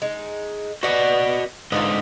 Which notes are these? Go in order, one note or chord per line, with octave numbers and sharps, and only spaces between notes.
G#3 D#4
B3 F#4 D5 D#5 F#5
G#2 D3 B3 D#4 F4 D#5